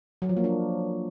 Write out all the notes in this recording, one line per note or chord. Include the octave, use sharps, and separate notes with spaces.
F#3
F3
A#3
D4